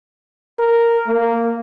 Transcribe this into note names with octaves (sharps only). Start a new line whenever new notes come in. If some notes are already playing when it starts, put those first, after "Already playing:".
A#4
A#3